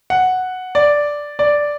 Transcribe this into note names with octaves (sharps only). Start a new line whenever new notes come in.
F#5
D5
D5